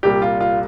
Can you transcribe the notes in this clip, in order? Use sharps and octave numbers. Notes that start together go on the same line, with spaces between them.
C2 A#2 G3 G4
F4
F4